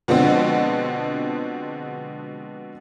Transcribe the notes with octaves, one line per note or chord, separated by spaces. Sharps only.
B2 D3 F3 G#3 B3 C4